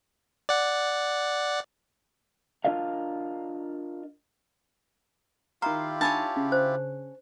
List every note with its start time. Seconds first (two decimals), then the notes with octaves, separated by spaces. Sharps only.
0.49 D5 F#5
2.65 D4 F4 A#4 D#5 F5
5.62 D#3 E4 F4 G4 F5 A#5 C6
6.01 D4 C#5 G#5 A5 B5 E6
6.37 C#3
6.52 C5